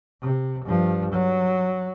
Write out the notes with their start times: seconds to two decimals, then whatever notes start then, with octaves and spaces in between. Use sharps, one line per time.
0.22 C3
0.65 G2 F3
1.12 F#3